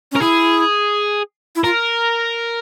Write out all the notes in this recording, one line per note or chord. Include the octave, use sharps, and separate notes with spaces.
C#4 A#4
E4 G#4
E4
F4 A#4